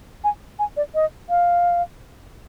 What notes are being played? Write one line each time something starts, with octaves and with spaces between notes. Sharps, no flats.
G#5
G#5
D5
D#5
F5